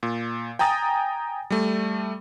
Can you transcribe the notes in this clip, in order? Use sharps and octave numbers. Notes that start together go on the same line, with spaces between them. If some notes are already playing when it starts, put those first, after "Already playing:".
A#2
G5 G#5 A#5 D#6 A6
G3 A3